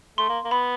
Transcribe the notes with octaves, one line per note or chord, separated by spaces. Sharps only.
A3 C6
A#3
A#3
B3 B5